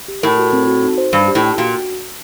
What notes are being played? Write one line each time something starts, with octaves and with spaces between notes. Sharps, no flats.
G4
A2 A#4
F#4
C4
F#4
D#4
C5
G2 D5
G4
A2
G5
A#2 F#4